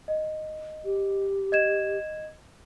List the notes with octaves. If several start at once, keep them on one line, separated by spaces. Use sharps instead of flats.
D#5
G4
D#5 G#6 E7